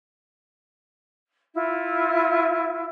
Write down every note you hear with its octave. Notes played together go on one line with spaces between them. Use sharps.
E4 F4